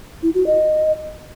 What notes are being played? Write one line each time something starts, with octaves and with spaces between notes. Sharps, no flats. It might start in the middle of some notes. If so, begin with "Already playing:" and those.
E4
F#4
D#5